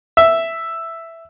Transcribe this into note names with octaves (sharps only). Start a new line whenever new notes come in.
E5